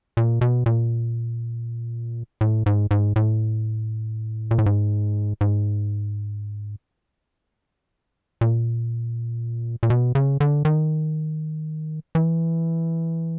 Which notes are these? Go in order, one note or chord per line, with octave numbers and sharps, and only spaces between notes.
A#2
B2
A#2
A2
G#2
G#2
A2
A#2
A2
G#2
G#2
A#2
A#2
B2
C#3
D3
D#3
E3